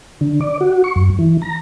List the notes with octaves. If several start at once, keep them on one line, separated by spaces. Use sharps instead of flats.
D3
D5
F#4
C#6
F#2
E3
A#5